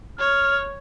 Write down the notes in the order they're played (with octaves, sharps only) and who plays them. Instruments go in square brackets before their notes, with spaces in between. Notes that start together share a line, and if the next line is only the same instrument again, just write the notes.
[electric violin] C#5 [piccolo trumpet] F6